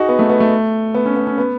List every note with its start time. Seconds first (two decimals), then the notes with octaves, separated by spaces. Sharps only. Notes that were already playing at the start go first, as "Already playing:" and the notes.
Already playing: D#4 F#4 G#4
0.08 B3
0.19 A3
0.30 B3
0.40 A3
0.94 B3
1.06 C#4
1.16 B3
1.27 C#4
1.38 B3